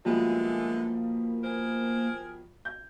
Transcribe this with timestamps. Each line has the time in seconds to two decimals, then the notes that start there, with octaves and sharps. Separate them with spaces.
0.05 B2 D3 E3 F3 G3 G#3 A#3
1.44 G#4 A#4 C5
2.65 G6